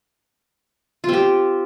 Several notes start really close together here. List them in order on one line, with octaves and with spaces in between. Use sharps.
F4 C4 G4